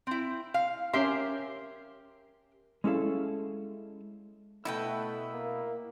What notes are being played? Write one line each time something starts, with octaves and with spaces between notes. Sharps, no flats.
C4 E4
F5
C#4 G4 A#4 E5 C6
G#3 C#4 E4 A4 F5
B2 A3 E4 B4 G5
A#3